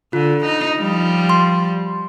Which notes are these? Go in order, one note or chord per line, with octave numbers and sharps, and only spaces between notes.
D3 F4
D#4
F3 G3
C6